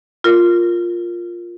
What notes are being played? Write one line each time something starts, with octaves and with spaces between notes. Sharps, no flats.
F4 A#4